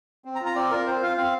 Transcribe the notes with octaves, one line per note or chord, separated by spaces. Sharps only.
C4
A#5
F4
A#5
C4 D5
F4 A#4
C4 C5
F4 F5
C4 F5